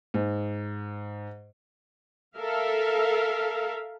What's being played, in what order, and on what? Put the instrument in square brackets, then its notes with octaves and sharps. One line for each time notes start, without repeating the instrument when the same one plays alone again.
[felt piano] G#2
[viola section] A4 A#4 E5 F5